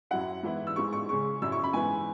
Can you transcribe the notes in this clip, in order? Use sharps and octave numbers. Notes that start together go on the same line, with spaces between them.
F#2 F#3 E4 F#5
G#2 E3 B3 E4
E6
G#2 E3 G#3 C#6
C#6
C#3 G#3 C#4 C#6
F#2 F#3 C#4 E4 E6
C#6
B5
G#2 E3 B3 G#5